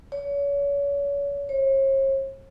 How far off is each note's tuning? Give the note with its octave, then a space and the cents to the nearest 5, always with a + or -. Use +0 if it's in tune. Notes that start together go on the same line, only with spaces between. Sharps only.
C#5 +35
C#5 -45